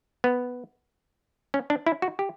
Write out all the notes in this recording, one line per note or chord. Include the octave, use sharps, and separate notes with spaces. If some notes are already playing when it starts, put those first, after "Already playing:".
B3
C#4
D4
E4
F#4
G4